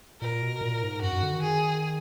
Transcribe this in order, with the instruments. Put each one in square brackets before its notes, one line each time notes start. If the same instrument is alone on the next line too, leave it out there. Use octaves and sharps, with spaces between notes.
[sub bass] A#2 [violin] A#4
[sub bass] B2
A#2
G#2
[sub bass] F#2 [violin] F#4
[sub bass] F#2
D3
D#3
[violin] G#4